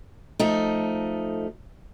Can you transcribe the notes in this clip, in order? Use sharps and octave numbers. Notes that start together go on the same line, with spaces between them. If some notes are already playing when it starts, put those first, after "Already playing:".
F3 A3 D#4